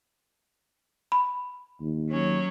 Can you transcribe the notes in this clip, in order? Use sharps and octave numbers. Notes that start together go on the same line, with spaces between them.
B5
D#2
F#3 C#4